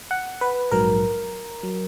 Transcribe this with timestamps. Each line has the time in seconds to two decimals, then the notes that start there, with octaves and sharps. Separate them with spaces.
0.11 F#5
0.41 B4
0.71 A#1 G#2 F#3 A#4
1.63 F#3